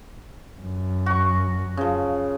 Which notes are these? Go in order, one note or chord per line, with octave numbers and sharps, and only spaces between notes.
F#2
F#4 C#6
C#3 F3